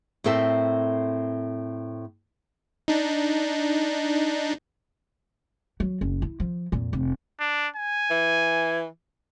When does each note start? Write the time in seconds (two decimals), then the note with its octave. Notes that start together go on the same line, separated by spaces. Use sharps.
0.24 A2 C4 A4 A#4 E5
2.88 D4 D#4
5.80 F#3
6.01 F#1
6.22 E4
6.40 F3
6.72 F2 A#2
6.93 F1
7.40 D4
7.76 G#5
8.11 E3